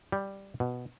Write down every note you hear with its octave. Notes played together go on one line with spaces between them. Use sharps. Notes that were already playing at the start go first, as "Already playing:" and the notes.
G3
B2